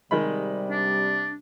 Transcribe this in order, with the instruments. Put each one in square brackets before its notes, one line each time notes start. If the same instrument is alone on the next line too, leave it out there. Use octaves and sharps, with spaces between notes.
[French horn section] C3 G3 [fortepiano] D#3 G#3 B5
[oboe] D4